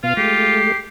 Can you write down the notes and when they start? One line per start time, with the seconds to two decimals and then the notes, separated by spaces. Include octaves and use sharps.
0.03 B2 B3 F4 F5
0.17 G#3 A3 G4 C7